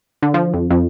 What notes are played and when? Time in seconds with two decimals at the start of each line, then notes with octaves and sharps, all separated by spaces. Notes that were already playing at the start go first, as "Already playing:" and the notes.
0.23 D3
0.34 F3
0.53 F2
0.71 F2